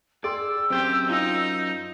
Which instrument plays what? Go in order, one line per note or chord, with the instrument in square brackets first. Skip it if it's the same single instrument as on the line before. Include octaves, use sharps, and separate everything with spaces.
[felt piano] G#4 G5 C6 [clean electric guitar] D5 [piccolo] E6
[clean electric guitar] F#2 C5 C6 [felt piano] C4 [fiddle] G4
[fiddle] D#4 [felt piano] F4